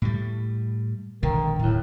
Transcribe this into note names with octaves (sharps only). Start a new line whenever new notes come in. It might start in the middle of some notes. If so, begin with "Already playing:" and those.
A2 G3
E1 A#1 D3 D#3
D1 D#2 A2